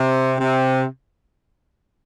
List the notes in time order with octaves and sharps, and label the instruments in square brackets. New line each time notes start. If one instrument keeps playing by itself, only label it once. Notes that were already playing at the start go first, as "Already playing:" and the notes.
Already playing: [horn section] C3
C3